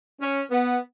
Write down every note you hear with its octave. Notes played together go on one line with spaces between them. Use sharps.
C#4
B3